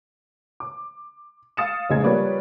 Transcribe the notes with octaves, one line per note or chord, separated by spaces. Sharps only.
D6
F5 D#6 A6 C#7 E7
F1 A#1 C#3 G#3 D#4 G#6
F3 G3 A#3 B4 C#5 D5